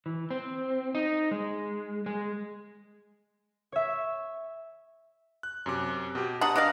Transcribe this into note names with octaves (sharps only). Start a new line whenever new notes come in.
E3
C4
D#4
G#3
G#3
C#5 E5
F#6
F#2 C3 D6
B2 G4
D4 F#5 A#5 D#6
D4 D5 D#5 F5